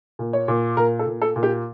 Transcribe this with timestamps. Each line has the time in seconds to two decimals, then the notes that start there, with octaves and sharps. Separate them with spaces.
0.19 A#2
0.33 C#5
0.48 A#2
0.77 A#2 A#4
0.99 A4
1.06 A#2
1.22 A4
1.36 A#2
1.43 G4